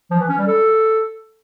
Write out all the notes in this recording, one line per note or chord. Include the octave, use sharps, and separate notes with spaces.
F3
E3
C#4
G3
A4